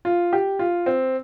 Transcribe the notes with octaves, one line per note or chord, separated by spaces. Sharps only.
F4
G4
F4
C4